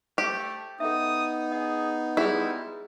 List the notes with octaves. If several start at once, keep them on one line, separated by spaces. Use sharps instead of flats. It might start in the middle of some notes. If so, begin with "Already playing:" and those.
A3 G4 C5
B3 D#4 A4 E5 D#6
G#4 D#5
G3 G#3 E4 F4 G#4